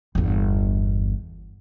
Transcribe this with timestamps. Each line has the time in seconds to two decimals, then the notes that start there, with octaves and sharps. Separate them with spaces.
0.15 G1 E2